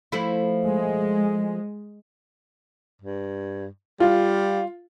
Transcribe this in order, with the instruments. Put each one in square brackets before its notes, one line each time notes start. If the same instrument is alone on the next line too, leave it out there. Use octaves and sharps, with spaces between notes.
[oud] F3 A3 E4
[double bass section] G#3
[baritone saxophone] G2
[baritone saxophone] G3 [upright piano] F4